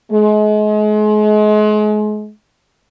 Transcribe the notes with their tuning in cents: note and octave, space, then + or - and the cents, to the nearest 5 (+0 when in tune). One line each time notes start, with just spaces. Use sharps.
G#3 +35